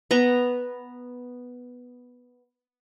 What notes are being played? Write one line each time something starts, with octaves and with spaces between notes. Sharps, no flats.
B3 A#5